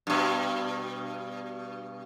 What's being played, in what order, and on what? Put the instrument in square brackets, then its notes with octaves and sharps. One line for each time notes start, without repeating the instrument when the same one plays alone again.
[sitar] G2 B2